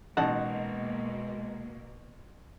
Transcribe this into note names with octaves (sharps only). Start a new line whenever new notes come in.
A1 B2 G#3 A#3 D#4 F#5 A5